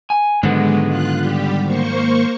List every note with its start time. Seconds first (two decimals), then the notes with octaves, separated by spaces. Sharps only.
0.10 G#5
0.43 G#2 D3 D#3 F#3 G#3 B3
0.86 F4 F#6
1.17 G3 G4
1.64 A#3 C5 C#6